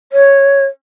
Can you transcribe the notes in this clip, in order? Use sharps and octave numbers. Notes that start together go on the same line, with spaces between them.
C#5